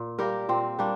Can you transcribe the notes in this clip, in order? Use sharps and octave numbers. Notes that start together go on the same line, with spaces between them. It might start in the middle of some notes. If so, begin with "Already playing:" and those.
Already playing: A#2
G3 A#3 G4 A#4
A#2 C4
G3 A#3 D4